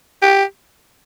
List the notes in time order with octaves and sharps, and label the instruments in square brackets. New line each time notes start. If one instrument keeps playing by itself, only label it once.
[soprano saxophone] G4